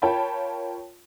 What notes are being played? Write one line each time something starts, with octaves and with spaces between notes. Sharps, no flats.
F4 A#4 C#5 G5 A5 B5